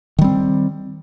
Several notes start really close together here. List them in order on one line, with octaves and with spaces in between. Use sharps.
D#3 G3 C4